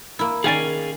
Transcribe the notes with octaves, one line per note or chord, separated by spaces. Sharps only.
A#3 E4
D#3 C#4 G#4 D5 F5 G#5